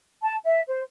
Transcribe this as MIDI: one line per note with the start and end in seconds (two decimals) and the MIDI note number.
0.23 0.38 81
0.45 0.62 76
0.68 0.81 72